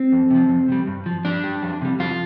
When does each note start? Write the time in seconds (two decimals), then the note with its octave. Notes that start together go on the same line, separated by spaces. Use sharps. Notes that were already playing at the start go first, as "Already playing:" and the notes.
Already playing: C4
0.12 F2
0.31 C3 F3
0.49 F2
0.68 C3 G3
0.87 G2
1.06 F3
1.25 G2 D4
1.44 G3
1.62 F2
1.82 C3 G3
1.99 F2 F4